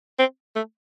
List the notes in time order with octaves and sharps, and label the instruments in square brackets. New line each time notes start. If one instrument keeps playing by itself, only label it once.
[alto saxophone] C4
A3